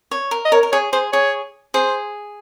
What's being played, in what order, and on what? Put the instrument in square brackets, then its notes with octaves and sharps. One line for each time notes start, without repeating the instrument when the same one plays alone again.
[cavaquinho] C#5
A#4
[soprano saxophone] D#5
[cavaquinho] A#4 [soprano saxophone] C#5
[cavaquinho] A#4
[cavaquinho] G#4 [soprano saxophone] C#5
[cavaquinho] G#4 [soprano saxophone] C5
[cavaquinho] G#4 [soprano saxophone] C#5
[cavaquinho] G#4 [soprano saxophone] C5